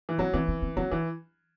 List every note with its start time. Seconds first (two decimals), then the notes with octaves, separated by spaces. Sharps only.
0.09 E3
0.18 F#3 C4
0.33 E3 C4
0.48 C4
0.62 C4
0.77 F#3 C4
0.91 E3 D4